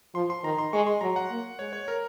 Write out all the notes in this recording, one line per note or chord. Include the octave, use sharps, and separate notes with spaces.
F3 C6
C6
D#3 A#5
C6
G#3 C#6
C6
F#3 A#5
F#5
A#3
G#3 C#5
C#5
A#4